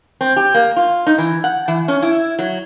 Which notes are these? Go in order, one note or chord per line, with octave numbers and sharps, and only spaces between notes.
C4
G4
A#3
F4
D#4
E3
F#5
E3
C#4
E4
F#3